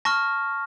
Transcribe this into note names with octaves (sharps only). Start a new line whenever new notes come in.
A5 C#6 F6 A#6